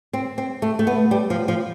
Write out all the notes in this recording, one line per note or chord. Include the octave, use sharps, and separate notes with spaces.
C4
C4
A3
A3
B3
G3
F3
F3